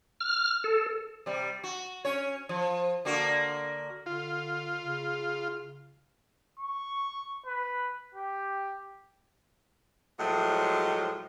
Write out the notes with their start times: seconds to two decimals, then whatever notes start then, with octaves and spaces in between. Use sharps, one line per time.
0.21 F6
0.64 A4
1.26 C3 G3
1.63 F#4
2.05 C#4 C#5
2.49 F3
3.05 D3 A#3 F#4
4.06 D3 F4
4.79 C#3
6.59 C#6
7.46 B4
8.15 G4
10.20 A2 F3 F#3 G#3